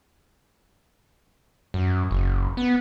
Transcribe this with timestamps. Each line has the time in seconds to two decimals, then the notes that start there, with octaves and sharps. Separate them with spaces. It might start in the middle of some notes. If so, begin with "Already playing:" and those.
1.74 F#2
2.11 F#1
2.57 B3